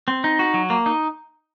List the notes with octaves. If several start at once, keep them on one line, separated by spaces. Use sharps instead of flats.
C4
D#4
F#4
F#3
A#3
D#4